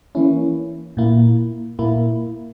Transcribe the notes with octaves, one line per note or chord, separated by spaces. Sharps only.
E3 A#3 C#4 E4
A#2 A#3 E4
A#2 A#3 E4